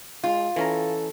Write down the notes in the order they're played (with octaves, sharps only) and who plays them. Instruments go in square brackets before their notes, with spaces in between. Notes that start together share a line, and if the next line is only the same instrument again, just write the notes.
[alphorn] G#3 [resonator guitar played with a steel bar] F4
[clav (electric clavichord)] E3 C#4 A#5 [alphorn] A4